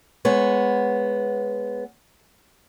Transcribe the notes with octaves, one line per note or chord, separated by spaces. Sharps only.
G#3 B3 C#5